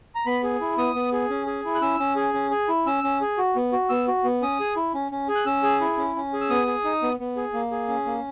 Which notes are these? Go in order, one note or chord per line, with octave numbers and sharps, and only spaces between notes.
A#5
B3 B5
G#4
E4
B3 D#6
B3
G#4
C#4
G#4
E4
F#6
C#4 E6
C#4
G#4
C#4
G#4
E4
C#4 E6
C#4
G#4
F#4
B3
F#4
B3 E6
F#4
B3
C#4 D#6
G#4
E4
C#4
C#4
G#4
F#6
C#4 E6
G#4
E4
C#4
C#4
G#4
E6
B3 D#6
G#4
D#4
B3
B3
G#4
A#3
G#4
C#4
A#3